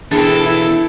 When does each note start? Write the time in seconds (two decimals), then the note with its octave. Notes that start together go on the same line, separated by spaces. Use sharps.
0.11 B2 E3 D4 G#4 A4 G5 A6 C#7
0.46 E4